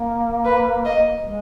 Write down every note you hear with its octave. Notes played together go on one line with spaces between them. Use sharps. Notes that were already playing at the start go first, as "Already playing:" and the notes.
Already playing: A#3
B4
D#5
G#3